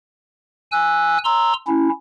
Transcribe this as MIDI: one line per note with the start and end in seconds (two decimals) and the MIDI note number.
0.72 1.18 80
0.72 1.18 88
0.72 1.18 90
1.24 1.53 82
1.24 1.53 84
1.24 1.53 88
1.68 1.89 61
1.68 1.89 64